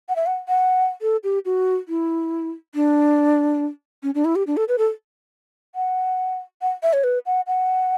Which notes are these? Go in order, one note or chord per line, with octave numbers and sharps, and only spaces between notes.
F#5
E5
F#5
F#5
A4
G4
F#4
E4
D4
C#4
D4
E4
G4
D4
A4
B4
A4
F#5
F#5
E5
C#5
B4
F#5
F#5